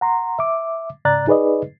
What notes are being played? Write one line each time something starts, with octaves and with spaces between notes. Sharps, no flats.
F#5 A#5 C6
E5 D6
G#2 C#3 D5 A#5 F#6 A6
D#4 G#4 B4 D5 D#5